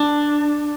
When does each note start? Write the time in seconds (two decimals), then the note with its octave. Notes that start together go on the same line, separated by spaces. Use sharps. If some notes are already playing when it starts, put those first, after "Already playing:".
Already playing: D4